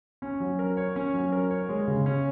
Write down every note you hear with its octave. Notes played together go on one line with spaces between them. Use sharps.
C#4
F#3
A#4
C#5
C#4
F#3
A#4
C#5
G#3
C#3
C#4